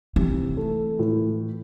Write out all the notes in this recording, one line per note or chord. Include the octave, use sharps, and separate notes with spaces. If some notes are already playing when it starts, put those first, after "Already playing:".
C3 E3
A3
A2